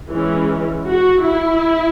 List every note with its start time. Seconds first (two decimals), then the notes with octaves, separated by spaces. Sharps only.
0.11 E3 G#3 C#4
0.86 F#4
1.25 E4